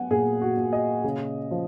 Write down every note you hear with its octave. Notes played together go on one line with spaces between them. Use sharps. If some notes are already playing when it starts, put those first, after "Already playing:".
Already playing: F#3 B3 F#5 G#5
A#2 G#4
F#4
A#2
D#5
C#3
F3